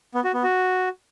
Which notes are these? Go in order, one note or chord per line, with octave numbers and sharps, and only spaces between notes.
B3
F#4
B3
F#4